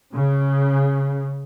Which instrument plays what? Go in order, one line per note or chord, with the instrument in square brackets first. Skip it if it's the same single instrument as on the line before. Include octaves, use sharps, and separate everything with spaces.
[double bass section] C#3